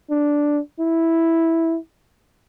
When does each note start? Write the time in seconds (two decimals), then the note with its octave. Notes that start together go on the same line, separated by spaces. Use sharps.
0.10 D4
0.80 E4